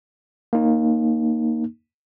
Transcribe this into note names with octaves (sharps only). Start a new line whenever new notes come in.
A#3 D#4